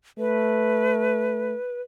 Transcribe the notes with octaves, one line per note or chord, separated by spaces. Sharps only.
A3 B4